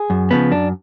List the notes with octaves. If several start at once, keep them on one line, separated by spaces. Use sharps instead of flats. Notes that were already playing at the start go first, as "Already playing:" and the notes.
Already playing: G#4
F#2
C#3 F3 B3
F#2 D4